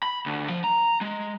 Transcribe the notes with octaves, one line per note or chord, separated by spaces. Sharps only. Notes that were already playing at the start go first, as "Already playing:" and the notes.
B5
D2
F3
A#5
G#3